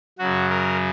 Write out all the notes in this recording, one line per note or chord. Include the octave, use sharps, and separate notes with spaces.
F#2 C#3 F#3 F#4
A#4